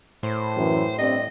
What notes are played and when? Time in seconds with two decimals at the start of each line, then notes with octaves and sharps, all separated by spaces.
0.23 A2 C5
0.57 F#2 E3
0.98 G2 C4 D5 D#5